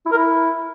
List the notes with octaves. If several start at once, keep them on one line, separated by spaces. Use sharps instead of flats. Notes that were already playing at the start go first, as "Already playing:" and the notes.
E4
A#4
E4